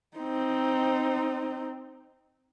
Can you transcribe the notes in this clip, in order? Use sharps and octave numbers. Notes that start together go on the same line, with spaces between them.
C4 D#4